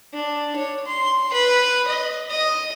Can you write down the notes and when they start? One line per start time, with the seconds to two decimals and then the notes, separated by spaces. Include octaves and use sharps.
0.14 D4
0.56 C#5
0.86 C6
1.33 B4
1.87 D#5
2.30 D#5